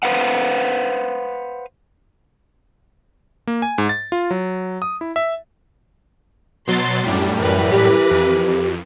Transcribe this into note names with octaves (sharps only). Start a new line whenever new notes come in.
B4 C5 F5 F#5
A#3
G#5
G#2
A6
F4
F#3
D#6
E4
E5
B2 F#3 C6 A6
F#2 A2 G3 D4
E3 A#4 B4
G4
F2